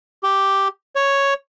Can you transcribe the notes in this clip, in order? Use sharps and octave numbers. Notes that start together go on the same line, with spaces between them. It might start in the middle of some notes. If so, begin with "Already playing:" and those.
G4
C#5